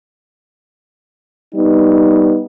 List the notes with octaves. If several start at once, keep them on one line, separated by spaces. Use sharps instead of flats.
G3 B3 D#4